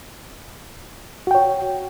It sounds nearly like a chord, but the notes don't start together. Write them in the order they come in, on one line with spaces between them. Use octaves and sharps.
F#4 G5 C#5